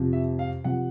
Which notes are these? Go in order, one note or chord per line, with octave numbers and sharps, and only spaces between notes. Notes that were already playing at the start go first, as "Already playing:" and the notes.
Already playing: F2 C3 F3
E5
F5
C3 F3 F#5